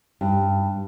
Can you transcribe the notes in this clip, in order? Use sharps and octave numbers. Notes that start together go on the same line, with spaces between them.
G2